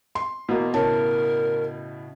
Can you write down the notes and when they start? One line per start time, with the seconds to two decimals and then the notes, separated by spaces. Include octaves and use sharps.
0.15 C6
0.49 B2 E3 A#3
0.74 A2 C#3 A#4 C#5 A5